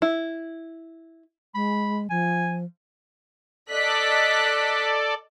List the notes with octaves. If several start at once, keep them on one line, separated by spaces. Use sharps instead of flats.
E4
G#3 B5
F3 G#5
A4 D5 D#5 F#6 B6